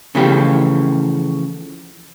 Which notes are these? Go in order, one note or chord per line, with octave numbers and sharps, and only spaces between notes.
C#3 E3 F3 A3 B3 G4